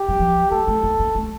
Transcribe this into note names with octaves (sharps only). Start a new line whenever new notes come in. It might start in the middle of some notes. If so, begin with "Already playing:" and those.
Already playing: G4
G3
F3
A3 A4
A3
A#3
A#3
A3